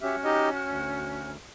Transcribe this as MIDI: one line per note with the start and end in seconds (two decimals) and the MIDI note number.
0.01 1.31 61
0.01 1.31 66
0.01 0.16 67
0.01 0.16 76
0.01 1.31 89
0.24 0.49 63
0.24 0.49 67
0.24 0.49 75
0.66 1.36 38